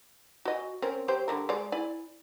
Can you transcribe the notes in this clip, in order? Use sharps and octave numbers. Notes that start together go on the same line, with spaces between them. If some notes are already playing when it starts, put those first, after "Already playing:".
F#4 D#5 G#5
C4 C#4 A#4
F#3 G4 C5
D3 G3 A#4
G#3 D5
E4 D5 G#5